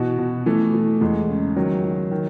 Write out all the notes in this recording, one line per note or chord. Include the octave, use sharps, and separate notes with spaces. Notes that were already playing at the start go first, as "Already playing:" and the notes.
Already playing: B2 E3 F#4
B2
E3 A3
E3
E2 G#3
C#3
D#3 F#3
D#3
D#3